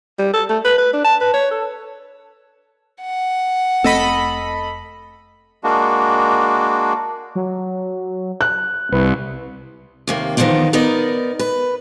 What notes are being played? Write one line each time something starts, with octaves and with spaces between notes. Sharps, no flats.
G3
A4
A3
B4
B4
D4
A5
B4
C#5
A4
F#5
F1 A3 C4 A4 D#5 B5
G#3 A#3 D4 F#4
F#3
F#6
C2 B4
D#2 C3 A#3
E2 D#3 F3 B3 C4 D4
B3 D#4 A#4 D5
B4